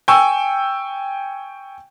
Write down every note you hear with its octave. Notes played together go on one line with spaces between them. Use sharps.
G5 G#5 C#6 E6